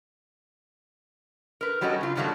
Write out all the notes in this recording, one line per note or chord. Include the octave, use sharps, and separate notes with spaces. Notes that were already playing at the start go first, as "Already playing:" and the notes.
A#4 B4
F#3 G3 C#4 F#4 A4 D#5
C#3 F4
G2 B2 D#3 F#3 G3 A3